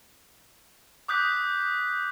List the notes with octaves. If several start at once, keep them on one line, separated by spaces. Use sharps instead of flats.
D6 D#6 F#6 G6 B6